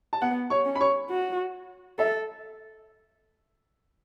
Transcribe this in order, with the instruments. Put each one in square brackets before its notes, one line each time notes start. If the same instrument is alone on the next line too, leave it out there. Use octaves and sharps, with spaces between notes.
[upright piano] A5
[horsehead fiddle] B3 [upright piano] F#5
[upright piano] C#5 C#6
[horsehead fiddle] C#4
[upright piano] B5
C#5 C#6
[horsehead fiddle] F#4
[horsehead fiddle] A4 [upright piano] E5